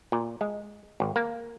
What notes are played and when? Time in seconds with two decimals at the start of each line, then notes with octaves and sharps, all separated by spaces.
0.12 A#2
0.41 G#3
1.00 G#1
1.16 A#3